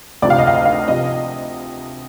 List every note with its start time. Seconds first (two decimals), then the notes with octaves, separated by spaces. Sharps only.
0.22 D2 C3 F3 D5
0.30 F5
0.38 D#5
0.47 F5
0.55 D#5
0.65 F5
0.88 C3 F3 D#5